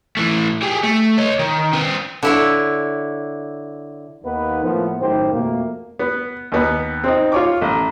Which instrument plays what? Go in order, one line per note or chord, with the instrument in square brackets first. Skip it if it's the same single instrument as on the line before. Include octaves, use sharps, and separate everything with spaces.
[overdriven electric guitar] E3 A3
G4 G#4
A3
C#5 D#5
D#3
C4 B4
[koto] D3 E4 C#5
[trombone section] D#2 D#3 A#3 B3 D#4 B4
A2 F3 A#3 B3
F#2 A2 D#3 G4 C5
F2 B2 A3 A#3
[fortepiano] B3
D#2 B3
C4 D#4
F4 C#5 D6
A1